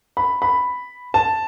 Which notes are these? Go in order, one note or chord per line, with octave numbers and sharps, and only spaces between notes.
B5
B5
A5